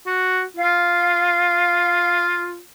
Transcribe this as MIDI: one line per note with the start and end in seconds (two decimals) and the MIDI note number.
0.06 0.43 66
0.57 2.61 65
0.57 2.23 77